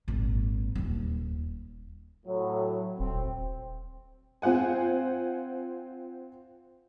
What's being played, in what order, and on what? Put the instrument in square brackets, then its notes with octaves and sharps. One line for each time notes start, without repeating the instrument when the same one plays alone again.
[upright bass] G#1 A#2
D#1 D#2
[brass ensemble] A2 F#3
[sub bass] D#1 [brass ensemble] C4
[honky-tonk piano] C4 F4 C5 F#5 G#5